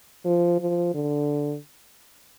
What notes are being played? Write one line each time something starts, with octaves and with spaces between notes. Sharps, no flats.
F3
F3
D3